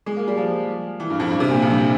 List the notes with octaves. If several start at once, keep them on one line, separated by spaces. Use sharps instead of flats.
G#3
A#3
G3
F3
E3
G2
F2
G2
C3
A#2
F2
G2